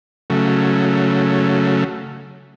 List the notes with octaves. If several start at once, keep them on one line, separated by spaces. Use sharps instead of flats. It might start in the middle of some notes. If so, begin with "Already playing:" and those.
C#3 F#3 A3